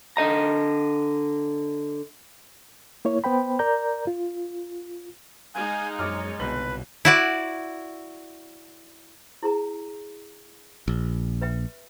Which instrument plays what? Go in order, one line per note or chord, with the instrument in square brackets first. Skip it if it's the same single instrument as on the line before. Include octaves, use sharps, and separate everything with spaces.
[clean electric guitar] D3 D#5 A#5
[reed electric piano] A#3 E4 C#5
B3 C5 G5 B5
A#4 D5 A#5 G6
F4
[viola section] G#3 D#4 [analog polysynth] F5 F#6 G6 [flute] G#5
[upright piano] A#1 D6 F6 [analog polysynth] F#2 [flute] C#5
[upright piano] G1 F#7 [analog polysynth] C2 B2 [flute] B4
[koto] E4 F#4 D5
[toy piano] E4 G#4 A#5
[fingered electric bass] A#1
[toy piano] B4 E5 G5